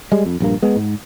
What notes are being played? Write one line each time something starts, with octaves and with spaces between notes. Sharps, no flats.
G3 G#3
F2
A#1 G2 A#3
G#3 B3
G#2